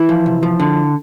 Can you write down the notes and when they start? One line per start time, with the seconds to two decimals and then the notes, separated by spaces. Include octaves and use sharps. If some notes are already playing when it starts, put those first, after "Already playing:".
Already playing: E3 E4
0.09 F3
0.26 C3
0.43 F3
0.60 D3